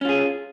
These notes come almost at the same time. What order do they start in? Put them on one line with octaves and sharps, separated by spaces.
C#4 F4 G#4